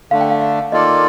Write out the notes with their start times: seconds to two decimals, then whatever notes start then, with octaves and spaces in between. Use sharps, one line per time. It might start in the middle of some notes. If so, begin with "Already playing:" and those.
0.11 D3 A3 D4 F5
0.21 G5
0.30 F5
0.41 F5
0.72 D#3 A#3 F4 A4 D5 D#5